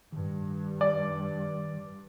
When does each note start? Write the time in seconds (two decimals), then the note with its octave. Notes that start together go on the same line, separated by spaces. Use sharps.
0.12 G2 D#3
0.81 D5